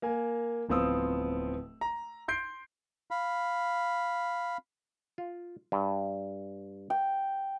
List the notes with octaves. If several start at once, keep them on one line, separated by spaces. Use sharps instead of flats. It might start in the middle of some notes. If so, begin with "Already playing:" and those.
A#3 A#4 G#5
D1 F3 B3 C4 D#6 E6
A#5
C6 G6 C7 D7
F5 B5
F4
G2
G5